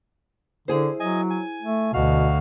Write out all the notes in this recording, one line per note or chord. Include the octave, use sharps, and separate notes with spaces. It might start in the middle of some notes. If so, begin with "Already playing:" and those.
D3 E4 G#4 C5
F#3 D#5 G#5
G#5
A3
D2 B2 F#4 F5